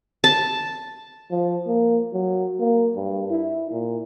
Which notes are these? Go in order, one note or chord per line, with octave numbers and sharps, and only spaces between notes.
A5
F3
A#3
F#3
A#3
G2
E4
A#2